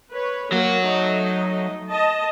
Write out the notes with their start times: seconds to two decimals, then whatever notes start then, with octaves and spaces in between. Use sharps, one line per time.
0.13 B4 C#5
0.52 F#3 A#3 F#4
0.83 A3 D#4 D#5
1.90 D#5 A5